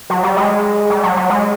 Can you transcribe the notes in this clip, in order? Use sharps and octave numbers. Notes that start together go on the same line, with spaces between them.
F#3
G3
G#3
G3
F#3
F#3
G#3